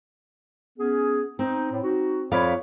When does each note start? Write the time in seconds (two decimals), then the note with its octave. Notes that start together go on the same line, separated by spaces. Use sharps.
0.79 B3 C#4 G#4
1.39 C4 D#4
1.71 A2
1.83 D#4 F#4
2.32 F2 C#5 D5 F5 B5